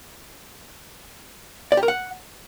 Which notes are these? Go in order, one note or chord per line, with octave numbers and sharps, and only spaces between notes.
D5
G4
A#4
F#5